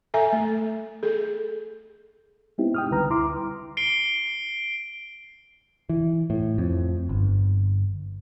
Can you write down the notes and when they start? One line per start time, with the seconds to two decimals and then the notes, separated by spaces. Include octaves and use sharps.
0.14 A4 E5 G#5 A#5
0.33 A3
1.03 G#4 A4
2.58 G#3 B3 C4 D#4 E4 G4
2.74 G5 D#6 F6
2.90 C2 D3 G3 B4 A#5 F6
3.10 D2 E4 A#5 C6 D6
3.77 C7 D7 G7
5.89 E3
6.30 A2
6.58 F2
7.09 G1